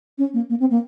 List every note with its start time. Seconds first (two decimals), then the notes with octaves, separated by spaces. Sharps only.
0.18 C#4
0.34 A#3
0.50 A#3
0.60 C4
0.71 A#3